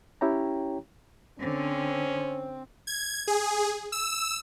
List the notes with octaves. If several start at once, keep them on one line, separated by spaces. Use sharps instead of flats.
C#4 E4 G4 C#5 G5 A#5
D3 C4 C#4
G#6
G#4
E6